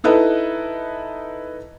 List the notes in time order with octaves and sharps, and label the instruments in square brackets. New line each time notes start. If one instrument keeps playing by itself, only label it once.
[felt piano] D#4 E4 A4 B4 D#5